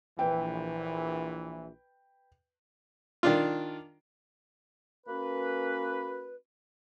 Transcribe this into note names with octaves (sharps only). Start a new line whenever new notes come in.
A#1 E3 B4 G5
D#3 D4 F4
A#3 C#4 F#4 B4